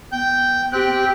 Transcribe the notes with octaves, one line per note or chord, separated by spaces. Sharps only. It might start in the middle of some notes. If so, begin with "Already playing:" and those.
B3 G5 G6
C4 G4 G5 F#6